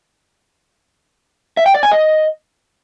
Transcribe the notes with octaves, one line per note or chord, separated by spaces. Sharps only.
E5
G5
D5
G#5
D#5